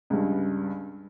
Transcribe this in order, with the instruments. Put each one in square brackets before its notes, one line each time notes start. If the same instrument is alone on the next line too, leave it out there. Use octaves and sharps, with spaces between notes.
[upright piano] C#2 G2